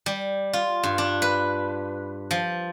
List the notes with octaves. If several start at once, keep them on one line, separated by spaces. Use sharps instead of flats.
G3
F4
G2
D4
B4
F3